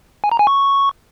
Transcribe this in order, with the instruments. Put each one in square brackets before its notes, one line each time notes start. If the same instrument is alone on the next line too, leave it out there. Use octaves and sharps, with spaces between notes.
[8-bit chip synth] G#5
A#5
G#5
C#6